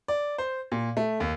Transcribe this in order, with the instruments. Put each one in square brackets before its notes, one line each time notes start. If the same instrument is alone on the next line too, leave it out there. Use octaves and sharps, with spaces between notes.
[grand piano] D5
C5
A#2
A3
D#2